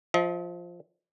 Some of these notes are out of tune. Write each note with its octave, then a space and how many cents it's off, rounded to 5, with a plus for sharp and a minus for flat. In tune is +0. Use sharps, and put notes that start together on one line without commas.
F3 +0 D#5 +45